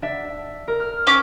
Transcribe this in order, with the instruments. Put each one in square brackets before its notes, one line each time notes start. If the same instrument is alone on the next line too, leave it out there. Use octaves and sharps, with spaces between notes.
[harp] D4 E5
A#4
F6
[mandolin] C#4 D6